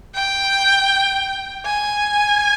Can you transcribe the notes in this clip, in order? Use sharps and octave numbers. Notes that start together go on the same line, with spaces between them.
G5
G#5